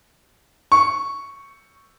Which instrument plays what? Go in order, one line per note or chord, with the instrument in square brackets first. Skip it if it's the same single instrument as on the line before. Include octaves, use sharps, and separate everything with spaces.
[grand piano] C#6